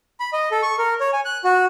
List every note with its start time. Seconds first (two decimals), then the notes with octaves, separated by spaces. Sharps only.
0.20 B5
0.33 D#5
0.51 A4
0.63 C#6
0.78 A#4
1.00 C#5
1.13 G#5
1.25 F#6
1.44 F#4